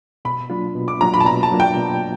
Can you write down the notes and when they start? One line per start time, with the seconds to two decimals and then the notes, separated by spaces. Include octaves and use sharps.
0.25 B2 B5
0.50 F#3 A#3 D4 F4
0.75 B2
0.88 D6
1.01 F#3 A#3 D4 F4 A#5
1.14 B5
1.20 A5
1.25 B2 A#5
1.43 A5
1.51 F#3 A#3 D4 F4
1.60 G5
1.77 B2